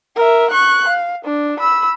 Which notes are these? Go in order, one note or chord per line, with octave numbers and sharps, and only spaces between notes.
A#4 E5
C#6 F#6
F5
D4
B5 E6